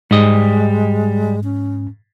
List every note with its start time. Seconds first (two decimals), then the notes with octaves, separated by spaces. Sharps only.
0.11 G#2 G3 G#3 D#5
1.44 C#4